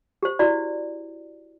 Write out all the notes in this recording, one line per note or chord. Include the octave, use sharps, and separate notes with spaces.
G4 C5
E4 F#4 D5